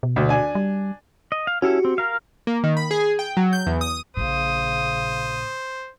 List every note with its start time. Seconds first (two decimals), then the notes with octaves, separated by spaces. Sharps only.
0.03 B2
0.16 D2
0.29 D4 G#5
0.55 G3
1.32 D#5
1.47 F5
1.62 C#4 E4 F#4 G4 A4 C#7
1.85 C4
1.98 A#4 F5
2.47 A#3
2.64 D#3
2.77 B5
2.91 G#4
3.19 G5
3.37 F#3
3.53 G6
3.66 E2
3.81 D#6
4.17 A#1 A#2 C#3 C5 D#6